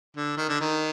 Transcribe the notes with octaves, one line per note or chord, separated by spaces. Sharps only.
D3
D#3
D3
D#3